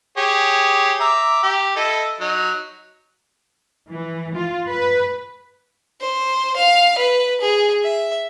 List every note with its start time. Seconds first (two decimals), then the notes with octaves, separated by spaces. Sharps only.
0.17 G4 G#4 C#5
1.00 E5 A#5 D6
1.43 G4
1.76 E4 A4 D#5
2.20 F#3 D#4
3.90 E3
4.36 F4
4.68 B4
6.01 C5
6.56 F5
6.98 B4
7.41 G#4
7.84 E5